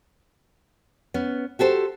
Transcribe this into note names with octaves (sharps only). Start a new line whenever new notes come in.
B3 C#4
F#4 G4 A4 C5